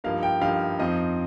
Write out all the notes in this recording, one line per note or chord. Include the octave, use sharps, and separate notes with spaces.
G2 F3 A#3 D#4 F5
G5
G2 F3 A#3 D#4 F5
F2 F3 C4 D#4 D#5